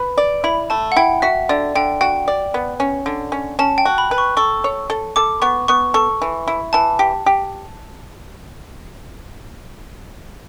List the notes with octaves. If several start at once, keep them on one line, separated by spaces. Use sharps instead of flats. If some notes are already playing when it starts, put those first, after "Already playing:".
Already playing: B4
D5
E4 B5
A3 A5
F#5
E4 G5
F#4 E5
D3 D5
D3 G5
F#4 G5
D5
B3
C#4
D3
C#4
C#4 A5
G5
F#4
B5
B4
C#6
A4 C#6
C#5
A4
A4 D6
B3 C#6
B3 C#6
A4 C#6
E3
E4
E3 A5
G4
G4